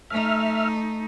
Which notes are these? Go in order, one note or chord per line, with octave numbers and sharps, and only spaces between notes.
A3 D#4 E5 F6